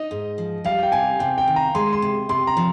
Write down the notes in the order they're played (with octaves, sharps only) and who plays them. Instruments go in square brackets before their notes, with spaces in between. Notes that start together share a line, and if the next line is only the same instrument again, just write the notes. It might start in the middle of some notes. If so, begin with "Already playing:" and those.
Already playing: [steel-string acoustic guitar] D#4 [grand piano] D#5
[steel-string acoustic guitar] G#2
F3
[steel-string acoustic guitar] G3 [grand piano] F5
[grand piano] G5
[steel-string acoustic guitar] C3 [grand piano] G#5
[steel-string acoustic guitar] C3 [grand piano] G5
[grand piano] G5
[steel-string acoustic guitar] D#3
[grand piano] A#5
[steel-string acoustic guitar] G#3 [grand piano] C6
[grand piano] C6
[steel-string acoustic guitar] C3
[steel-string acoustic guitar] C3 [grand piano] C6
[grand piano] A#5
[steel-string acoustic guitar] F3